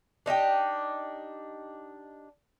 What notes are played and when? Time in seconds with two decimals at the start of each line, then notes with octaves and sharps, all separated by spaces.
0.26 D4 D#4 F#4 G4